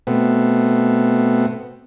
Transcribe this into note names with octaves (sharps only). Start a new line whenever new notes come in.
B2 A3 B3 C4